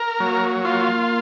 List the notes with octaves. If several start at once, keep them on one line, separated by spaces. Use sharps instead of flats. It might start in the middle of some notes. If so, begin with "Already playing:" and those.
Already playing: A#4
F#3 A#3
A#3 F4